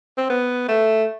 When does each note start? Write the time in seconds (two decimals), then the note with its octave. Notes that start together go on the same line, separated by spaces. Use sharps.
0.17 C4
0.29 B3
0.68 A3